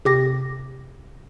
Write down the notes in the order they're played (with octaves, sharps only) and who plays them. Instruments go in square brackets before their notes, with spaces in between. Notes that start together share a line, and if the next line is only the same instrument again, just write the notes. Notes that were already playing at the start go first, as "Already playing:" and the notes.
[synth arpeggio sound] C3 G4 A#6